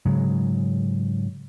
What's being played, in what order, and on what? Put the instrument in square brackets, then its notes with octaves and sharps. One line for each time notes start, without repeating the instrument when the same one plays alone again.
[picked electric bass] G#2 C#3 F#3 G#3